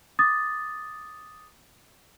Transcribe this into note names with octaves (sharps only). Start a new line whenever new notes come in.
D6 D#6 A6